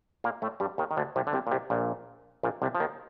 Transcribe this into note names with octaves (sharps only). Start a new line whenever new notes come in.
A#2 A#3
A2 A3
G2 G3
D#2 D#3
D#3
D2 D3
C2 C3
D3
C2 C3
A#2
C2 C3
A#1 A#2
A#1 A#2
C2 C3
F3
D#2 D#3